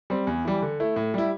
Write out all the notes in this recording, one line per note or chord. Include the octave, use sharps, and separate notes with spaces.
G3 C4
E2
E3 G3
D3
A3 E4
A2
G3 E4